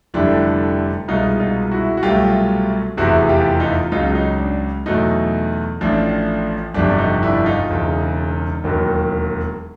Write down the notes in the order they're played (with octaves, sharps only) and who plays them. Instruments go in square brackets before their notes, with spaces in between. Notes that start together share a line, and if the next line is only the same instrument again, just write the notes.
[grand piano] F1 F2 D3 G3 D4 E4
C2 B2 G#3 D#4 F4
D#4 F4
E4 F#4
F#4
C2 B2 F#3 A3 F4 G4
F1 E2 C3 E3 F#4 G#4
F4 G4
D#4 F4
C#2 C#3 F#3 D#4 F4
D#4
D4
E2 B2 F#3 A3 D#4
A1 A2 F3 D4
G1 F2 C3 F3 D4
D#4
D4 E4
D#4 F4
E1 E2 C#3
E1 D#2 D#3 F#3